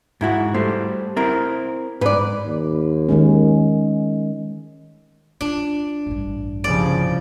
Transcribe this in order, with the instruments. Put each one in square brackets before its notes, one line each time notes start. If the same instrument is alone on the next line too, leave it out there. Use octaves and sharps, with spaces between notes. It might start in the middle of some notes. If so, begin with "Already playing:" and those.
[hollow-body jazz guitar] G#2 E4 F#4
G3 A3 C5
C4 E4 A#4
[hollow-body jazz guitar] G#2 [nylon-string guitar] B4 D5
[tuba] D#2
[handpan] D#3 G#3 C#4
[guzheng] D4 [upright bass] F4
[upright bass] A1 G2
[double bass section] C2 C#3 F3 [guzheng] D5